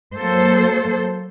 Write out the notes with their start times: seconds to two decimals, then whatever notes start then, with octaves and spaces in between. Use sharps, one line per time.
0.16 F#3 A#3 A4 C5